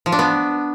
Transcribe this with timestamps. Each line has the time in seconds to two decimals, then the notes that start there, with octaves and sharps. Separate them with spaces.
0.06 F3
0.12 D4
0.19 B3